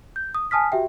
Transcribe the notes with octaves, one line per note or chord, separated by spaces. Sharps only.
G6
D#6
G#5 A5 D#6 F6 B6
F#4 G4 E5 G5